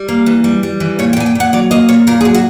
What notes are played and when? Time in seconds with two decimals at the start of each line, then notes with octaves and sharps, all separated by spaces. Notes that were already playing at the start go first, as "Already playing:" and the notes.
Already playing: G3
0.09 A#3
0.26 E3
0.44 G3
0.63 G3
0.80 E3
0.99 A#2 C#5
1.13 G5
1.17 A#2 G#5
1.26 G5
1.35 A#2 F#5
1.53 F#3 D5
1.71 A#3 D#5
1.89 A#2 C#5
2.07 A#2 A#4
2.21 G#4
2.25 F#3
2.35 F#4